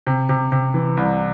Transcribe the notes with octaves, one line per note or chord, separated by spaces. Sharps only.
C3
C3
C3
E3
C2